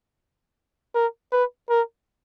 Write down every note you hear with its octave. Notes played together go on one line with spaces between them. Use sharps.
A#4
B4
A#4